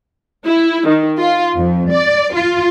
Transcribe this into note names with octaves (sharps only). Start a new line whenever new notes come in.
E4
D#3
F4
F2
D5
F4